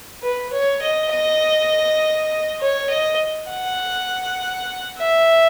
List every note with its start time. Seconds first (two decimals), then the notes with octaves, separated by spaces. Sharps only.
0.23 B4
0.52 C#5
0.82 D#5
1.12 D#5
2.61 C#5
2.90 D#5
3.50 F#5
4.98 E5